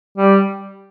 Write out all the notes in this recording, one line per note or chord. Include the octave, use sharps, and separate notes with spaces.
G3